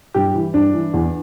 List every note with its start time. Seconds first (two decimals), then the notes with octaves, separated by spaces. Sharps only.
0.14 G2 G4
0.35 E3
0.54 G2 D4
0.74 E3
0.94 E2